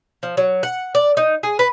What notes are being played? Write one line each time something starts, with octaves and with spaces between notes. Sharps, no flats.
F3
F#3
F#5
D5
D#4
G#4
B4